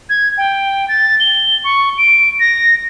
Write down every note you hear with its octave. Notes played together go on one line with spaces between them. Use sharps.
G#6
G5
A6
G7
C#6
D7
A#6